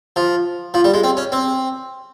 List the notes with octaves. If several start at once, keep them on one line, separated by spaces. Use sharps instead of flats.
F3
F3
G3
G#3
C4
C#4
C4